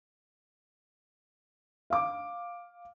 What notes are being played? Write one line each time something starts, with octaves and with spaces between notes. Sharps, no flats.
F5 D6